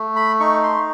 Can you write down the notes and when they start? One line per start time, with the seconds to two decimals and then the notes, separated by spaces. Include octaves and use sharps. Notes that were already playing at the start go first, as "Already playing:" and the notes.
Already playing: A3
0.16 B5
0.40 D#4 C#6
0.63 C6